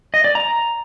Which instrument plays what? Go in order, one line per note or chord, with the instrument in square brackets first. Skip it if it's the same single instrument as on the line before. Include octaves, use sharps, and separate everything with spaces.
[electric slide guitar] D#5
D5
A#5